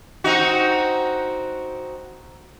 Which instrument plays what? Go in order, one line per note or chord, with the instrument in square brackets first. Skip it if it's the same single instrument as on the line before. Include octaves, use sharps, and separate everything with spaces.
[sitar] C4 D#4 F#4